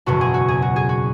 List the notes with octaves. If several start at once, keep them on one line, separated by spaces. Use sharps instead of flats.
F#1 E2 B2 F#4
G#4
F#4
G#4
F#4
G#4
F#4